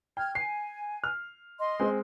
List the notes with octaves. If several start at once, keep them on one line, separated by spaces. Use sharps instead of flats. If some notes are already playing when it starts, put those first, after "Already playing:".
G5 F6 G#6
G#5 C7
F6
D#5 C6
G#3 C4